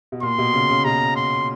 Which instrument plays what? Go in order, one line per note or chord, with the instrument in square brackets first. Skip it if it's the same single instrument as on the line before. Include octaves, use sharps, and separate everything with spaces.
[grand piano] B2
[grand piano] A#2 [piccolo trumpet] C6
[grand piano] B2
C#3
C#3
[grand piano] B2 [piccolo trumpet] A#5
[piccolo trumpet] C6